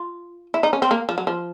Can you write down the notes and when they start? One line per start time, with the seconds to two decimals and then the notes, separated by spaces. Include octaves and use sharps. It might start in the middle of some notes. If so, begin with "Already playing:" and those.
Already playing: F4
0.54 E4
0.63 D#4
0.73 C#4
0.82 C4
0.91 A#3
1.09 F3
1.18 F#3
1.27 F3